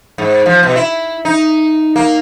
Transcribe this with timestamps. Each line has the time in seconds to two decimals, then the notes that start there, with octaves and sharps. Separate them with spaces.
0.18 G#2
0.46 F3
0.63 B2
0.76 E4
1.25 D#4
1.96 A#3